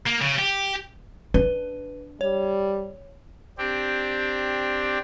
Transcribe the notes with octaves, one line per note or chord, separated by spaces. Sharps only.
A#3
C#3
G4
D4 B4
G3 C#5
C4 D4 G4